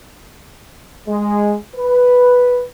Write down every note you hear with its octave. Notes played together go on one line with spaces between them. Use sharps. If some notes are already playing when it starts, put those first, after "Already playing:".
G#3
B4